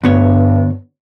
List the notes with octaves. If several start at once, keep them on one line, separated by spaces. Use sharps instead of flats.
D2 G2 B3 C#5